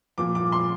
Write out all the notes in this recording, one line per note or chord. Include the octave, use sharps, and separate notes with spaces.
A#2 F3 D6
D6
C6